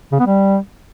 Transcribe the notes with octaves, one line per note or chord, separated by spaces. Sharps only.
C#3
B3
G3